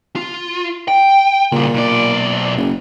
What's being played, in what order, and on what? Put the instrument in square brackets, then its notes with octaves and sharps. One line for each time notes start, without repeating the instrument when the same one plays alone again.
[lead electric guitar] F4
G5
[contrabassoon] A#2 [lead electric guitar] C#3 G3
[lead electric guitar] B1 D5
[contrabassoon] F#1